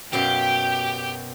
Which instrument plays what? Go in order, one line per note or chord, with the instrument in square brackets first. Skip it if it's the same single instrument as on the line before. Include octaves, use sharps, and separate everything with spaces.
[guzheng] F#2 B2 F5 [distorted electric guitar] G4 [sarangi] G5